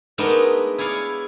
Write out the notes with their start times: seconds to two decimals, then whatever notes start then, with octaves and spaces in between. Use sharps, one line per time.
0.18 G#3 A3 B3 D4 D#4 A#4
0.78 E4 G#4 C#5 D5 F5